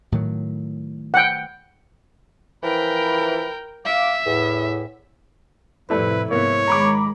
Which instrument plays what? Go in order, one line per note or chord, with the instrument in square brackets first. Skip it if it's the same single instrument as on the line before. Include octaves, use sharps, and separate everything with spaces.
[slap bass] A2 D#3 F#3
[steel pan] F#5 G5
[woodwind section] E3 F3 B5 [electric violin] A#4 G5
[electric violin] E5 [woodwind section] F5 D6
[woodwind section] E2 A2
[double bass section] F2 A2 C3 [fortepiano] G3 A3 [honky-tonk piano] E4 [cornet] B4
[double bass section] G#2 C3 [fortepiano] A#3 B3 [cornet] C#5
[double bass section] D#3 G#3 [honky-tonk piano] A#5 B5 D6